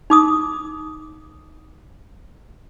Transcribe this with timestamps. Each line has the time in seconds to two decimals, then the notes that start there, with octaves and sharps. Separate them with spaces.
0.10 D#4 D6 D#6